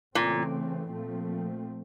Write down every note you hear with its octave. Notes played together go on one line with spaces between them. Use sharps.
A#2 C#3 E3 A3 C4
A#2 F3 A3 C4